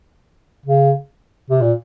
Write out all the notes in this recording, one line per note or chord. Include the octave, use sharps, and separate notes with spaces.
C#3
C3
A#2